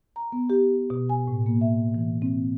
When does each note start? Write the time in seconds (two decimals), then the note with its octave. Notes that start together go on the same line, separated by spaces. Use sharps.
0.16 A#5
0.32 B3
0.50 G4
0.76 G4
0.90 B2
1.09 G#5
1.28 A2
1.46 A#3
1.61 E5
1.94 E3
2.22 C4